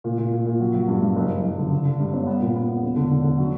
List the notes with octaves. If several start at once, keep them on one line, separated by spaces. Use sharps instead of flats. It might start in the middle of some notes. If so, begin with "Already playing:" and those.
A#2
A#2
A#2
A#2
F#3
F#3
G2
G2
F#1
F#1
F#1
D3
D3
D3
G2
G1
B3
A#2
B3
B3
E1
D3
D3
D3
F#3